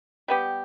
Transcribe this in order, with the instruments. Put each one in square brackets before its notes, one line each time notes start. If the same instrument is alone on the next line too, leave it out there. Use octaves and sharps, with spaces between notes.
[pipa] G3 B3 G4